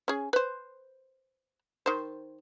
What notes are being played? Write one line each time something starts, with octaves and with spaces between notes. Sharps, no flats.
C#4 G#4
B4 C5
D#3 C5